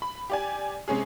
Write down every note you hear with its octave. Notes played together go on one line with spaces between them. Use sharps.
B5
G4 D5 G#5
C3 G#3 C#4 G#4